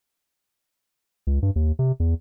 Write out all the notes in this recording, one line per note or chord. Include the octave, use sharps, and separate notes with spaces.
C#2
G2
D#2
C3
E2